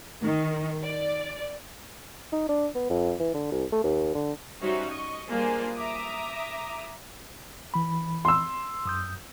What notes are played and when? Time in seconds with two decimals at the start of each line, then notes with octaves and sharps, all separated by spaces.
0.23 D#3
0.83 D5
2.32 D#4
2.49 D4
2.75 B3
2.90 F2
3.20 E3
3.34 D3
3.52 C2
3.72 A3
3.84 D#2
4.15 D3
4.61 G3 C#4 D#4 F#4 C5 E5
4.90 D#5 C#6
5.29 G3 A#3 D4 F4 G#4 C5
5.76 E5 A#5 D6 D#6
7.74 E3 B5
8.25 C6 E6
8.85 F#2 D#6 G6